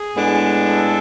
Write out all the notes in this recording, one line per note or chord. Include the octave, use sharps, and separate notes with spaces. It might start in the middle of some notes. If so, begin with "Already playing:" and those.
Already playing: G#4
A2 G#3 B3 D4
A4